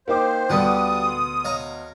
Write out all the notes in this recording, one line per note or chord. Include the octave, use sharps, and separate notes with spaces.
A#3 D#4 C5 F5 G5 D6
D2 D3 G3 B3 F#5 D#6
C6
C#5 D#5 F5 A#5